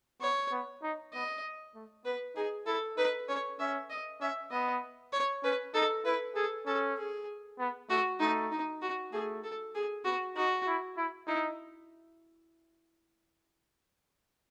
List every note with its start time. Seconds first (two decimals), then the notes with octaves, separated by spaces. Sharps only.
0.21 B3 C#5
0.52 B3
0.83 D#4
1.13 B3 D#5
1.75 A3
2.05 B3 B4
2.36 D#4 G#4
2.66 E4 A4
2.97 D#4 B4
3.28 C#4 C#5
3.59 C#4 E5
3.90 D#5
4.21 C#4 E5
4.51 B3 D#5
5.12 C#5
5.44 C#4 B4
5.74 D#4 A4
6.05 E4 B4
6.36 G#4 A4
6.66 C#4 A4
6.98 G#4
7.59 B3
7.90 A3 F#4
8.20 A3 D#4
8.51 D#4
8.82 F#4
9.13 A3 G#4
9.43 A4
9.75 G#4
10.05 B3 F#4
10.36 D#4 F#4
10.67 E4
10.97 E4
11.27 D#4 E4